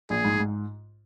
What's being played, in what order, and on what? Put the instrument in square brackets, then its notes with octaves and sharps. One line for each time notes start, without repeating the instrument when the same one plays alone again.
[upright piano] A#1 [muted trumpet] G#4
[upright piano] G#2
G#2